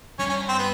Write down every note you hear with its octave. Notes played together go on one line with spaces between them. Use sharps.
G2 C#4
C#4
C4
B3